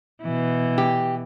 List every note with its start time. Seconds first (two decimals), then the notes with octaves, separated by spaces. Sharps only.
0.22 B2 E3
0.78 G4